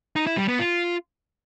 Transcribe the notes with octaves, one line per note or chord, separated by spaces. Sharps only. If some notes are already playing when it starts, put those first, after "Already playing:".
D#4
E4
G3
B3
F4